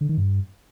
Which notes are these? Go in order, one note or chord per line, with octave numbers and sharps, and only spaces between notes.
D3
D#3
G2